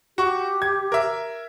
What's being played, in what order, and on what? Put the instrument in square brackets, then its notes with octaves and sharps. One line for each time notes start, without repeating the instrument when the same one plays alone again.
[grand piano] F#4 C#6 [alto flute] G4
[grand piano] G#6
A#4 E5